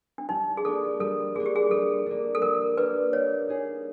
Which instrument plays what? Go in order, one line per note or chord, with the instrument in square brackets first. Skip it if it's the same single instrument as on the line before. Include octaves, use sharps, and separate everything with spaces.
[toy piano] D4
[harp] G3 [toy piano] D#4
[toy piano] G#4
[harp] A#3 D4 [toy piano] A4
[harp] G3 [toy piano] A4
[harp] A#3 D4 [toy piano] G#4
[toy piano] G4
G#4
[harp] G3 [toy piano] A4
[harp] A#3 D4
[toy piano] A4
[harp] G3 [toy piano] A#4
[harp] A#3 D4 [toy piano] B4
[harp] A#3 [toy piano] C#5
[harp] D#4 G#4